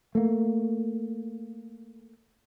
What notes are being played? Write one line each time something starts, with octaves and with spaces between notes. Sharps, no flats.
A3 A#3